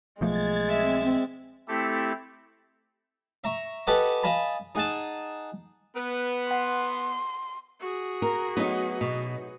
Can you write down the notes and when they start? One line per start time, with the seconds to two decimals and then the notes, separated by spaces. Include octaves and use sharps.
0.21 B1 F3 G#3 A3 G#6 A6
0.69 C4 E5
1.68 A3 C4 E4 G4 A4
3.44 E5 A#5 C#6
3.87 G4 A4 B4 D#5 F#5 G#5
4.23 D#5 F5 G#5 A5 B5
4.75 D#4 G#4 F#5 G#5 A5
5.96 B3 B4
6.51 F#5 C6
7.79 F#4 G#4
8.22 A#4
8.57 F#3 A3 B3 D#4
9.01 B2